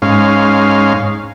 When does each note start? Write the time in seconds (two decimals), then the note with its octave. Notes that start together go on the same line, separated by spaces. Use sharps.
0.02 G#2 C#4 F5